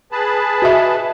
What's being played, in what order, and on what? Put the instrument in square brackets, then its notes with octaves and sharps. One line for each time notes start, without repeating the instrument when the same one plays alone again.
[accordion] G#4 B4 A5
[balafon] F#4 D#5 E5